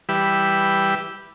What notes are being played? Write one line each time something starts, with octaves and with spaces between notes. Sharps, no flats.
E3 G3 G4 B4 E6